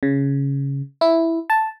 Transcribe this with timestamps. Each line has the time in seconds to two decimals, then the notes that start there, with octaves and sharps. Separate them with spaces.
0.03 C#3
1.01 E4
1.50 A5